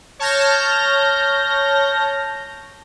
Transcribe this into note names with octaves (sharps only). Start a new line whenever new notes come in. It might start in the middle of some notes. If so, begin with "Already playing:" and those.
C#5 A5 F6 G6 A#6